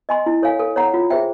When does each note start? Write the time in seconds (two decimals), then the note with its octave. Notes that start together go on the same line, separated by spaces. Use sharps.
0.09 D#5 G#5 C6
0.26 E4
0.42 A4 C#5 F5 G#5
0.59 A4
0.76 C#5 F#5 A#5
0.94 F4
1.10 G#4 C5 E5 G5